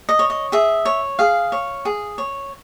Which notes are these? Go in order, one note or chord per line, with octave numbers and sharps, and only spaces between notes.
D#5
C#5
D#5
G#4 E5
C#5
G#4 F5
C#5
G#4
C#5